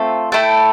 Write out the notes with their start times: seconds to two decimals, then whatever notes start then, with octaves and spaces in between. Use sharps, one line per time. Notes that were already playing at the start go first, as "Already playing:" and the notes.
Already playing: A3 C4 F4 A4
0.32 A3 E4 A4 G5